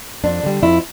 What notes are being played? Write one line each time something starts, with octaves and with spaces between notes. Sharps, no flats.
F2 D4
D3 G3
F2 E4